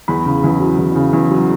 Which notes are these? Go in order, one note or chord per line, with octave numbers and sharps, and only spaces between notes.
E2 B5
C#3
E2
F#3
E2
C#3
E2
F#3